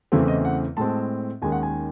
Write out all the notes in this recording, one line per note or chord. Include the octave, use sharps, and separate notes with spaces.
E2 C#3 E3 A3 C4 E4
D#5
F#5
A2 G#3 C4 A5
D#2 D#3 G#3 C#4 G#5
F#5
G#5